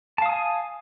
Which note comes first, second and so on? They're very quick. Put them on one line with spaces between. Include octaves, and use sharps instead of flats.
A5 F5 D#6 G#5